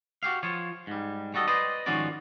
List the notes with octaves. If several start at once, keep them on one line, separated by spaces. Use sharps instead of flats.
F#4 G4 F5
F3 F4 C#5
G#2 G3
G3 F#4 A4 D#5
B4 C5 D5 D#5
G#2 D#3 F3 C#4 F#4 D5